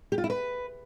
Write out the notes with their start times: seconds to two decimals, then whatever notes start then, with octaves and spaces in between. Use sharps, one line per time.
0.12 G4
0.18 F4
0.24 E4
0.30 B4